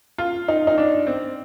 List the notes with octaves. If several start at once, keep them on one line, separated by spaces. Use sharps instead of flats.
F4
D#4
D#4
D4
C4